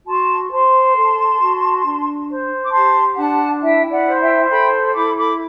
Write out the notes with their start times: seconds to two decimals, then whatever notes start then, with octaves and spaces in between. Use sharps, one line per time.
0.06 F#4 A5 C6
0.51 C5 A5 C6
0.96 A4
1.39 F#4
1.84 D4
2.28 C5
2.64 D6
2.72 G4 A5 C6
3.16 D4 F#5 A5
3.61 E4 E5 G5
3.91 D5 F#5
4.06 C5
4.21 E5 G5
4.50 A4 G5 B5
4.94 E4 B5 D6
5.16 B5 D6